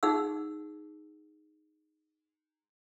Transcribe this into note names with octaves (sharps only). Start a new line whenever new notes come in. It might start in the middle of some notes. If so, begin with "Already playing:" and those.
D#4 G#4 F#5 E6